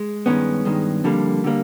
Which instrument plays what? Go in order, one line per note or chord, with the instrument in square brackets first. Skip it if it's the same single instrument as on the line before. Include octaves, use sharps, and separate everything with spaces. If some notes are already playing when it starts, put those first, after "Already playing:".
Already playing: [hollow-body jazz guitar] G#3
G2 D#3 G#3 B3 C#4
G2 D#3 G#3
F2 D3 G3 A#3
D3 G3 A#3